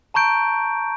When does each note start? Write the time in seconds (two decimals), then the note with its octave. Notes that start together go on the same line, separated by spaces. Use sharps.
0.14 A5 A#5 C#6 G6 D7